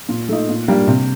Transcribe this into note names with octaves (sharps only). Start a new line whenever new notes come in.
A#2
A3 D#4
A#2
G3 A#3 D4 G4
C3